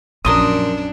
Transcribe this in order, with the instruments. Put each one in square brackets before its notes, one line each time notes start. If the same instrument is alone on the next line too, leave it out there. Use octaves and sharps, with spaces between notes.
[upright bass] A#1 [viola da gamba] F#2 D4 [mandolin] A#4 C6 D#6